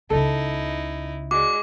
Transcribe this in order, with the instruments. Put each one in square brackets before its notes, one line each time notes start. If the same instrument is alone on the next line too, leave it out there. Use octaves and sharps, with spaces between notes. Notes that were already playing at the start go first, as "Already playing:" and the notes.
[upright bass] C#2 C#3 [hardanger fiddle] D#4 E4 [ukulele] A4
[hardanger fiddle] G#3 [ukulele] F#4 D5 [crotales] D6